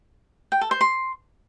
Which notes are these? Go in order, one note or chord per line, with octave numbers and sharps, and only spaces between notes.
G5
A4
C5
C6